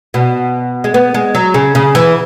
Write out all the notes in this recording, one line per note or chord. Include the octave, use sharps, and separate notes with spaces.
B2
G#3
B3
G#3
F#3
C#3
C#3
E3